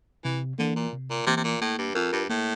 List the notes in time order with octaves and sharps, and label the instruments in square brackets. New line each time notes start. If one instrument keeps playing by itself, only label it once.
[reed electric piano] C3 [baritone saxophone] E3
[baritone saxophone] D3 [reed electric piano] E3 A#3
[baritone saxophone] A#2
[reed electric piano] C3
[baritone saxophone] A#2
[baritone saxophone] C3 [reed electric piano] E3 A#3
[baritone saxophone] C3
A#2
[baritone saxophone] A2 [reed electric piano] A#3
[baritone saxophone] G2
[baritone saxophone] F2 [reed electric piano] F4 A#4
[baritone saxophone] G2
[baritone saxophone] A2 [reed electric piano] A#3